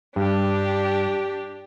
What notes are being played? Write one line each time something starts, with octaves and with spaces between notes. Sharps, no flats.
G2 D4 G4